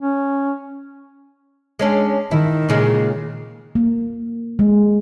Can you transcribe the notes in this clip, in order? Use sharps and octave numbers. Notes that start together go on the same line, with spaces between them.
C#4
G#3 C#4 D4
D#3 E4
A#2 C#3 G#3
A#3
G#3